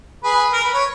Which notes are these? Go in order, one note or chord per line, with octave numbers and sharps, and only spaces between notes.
G#4 B4
A#4
B4
C#5